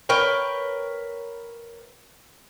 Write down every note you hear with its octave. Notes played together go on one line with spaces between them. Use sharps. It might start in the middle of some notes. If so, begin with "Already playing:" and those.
A#4 B4 C#5 G5